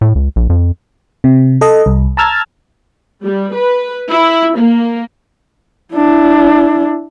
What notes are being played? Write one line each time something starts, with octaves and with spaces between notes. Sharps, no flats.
A2
C#2
A#1
F2
C3
A4 D#5
C2
A5 A#5 E6 F6 G#6 A6
G3
B4
E4
A#3
D4 E4